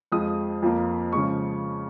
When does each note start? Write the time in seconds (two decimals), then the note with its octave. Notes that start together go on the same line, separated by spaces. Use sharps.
0.12 F2 F3 G#3 D#6
0.62 F2 F3 A#3
1.13 C#3 F3 G#3 C#6